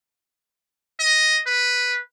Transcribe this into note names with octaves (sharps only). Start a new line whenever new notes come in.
D#5
B4